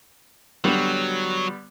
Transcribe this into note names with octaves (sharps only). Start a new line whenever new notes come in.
D3 F#3 G3 B3